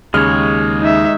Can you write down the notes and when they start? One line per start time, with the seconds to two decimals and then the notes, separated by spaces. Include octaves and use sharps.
0.14 D#2 C#3 G#3 C#5 F6
0.82 D#4 E5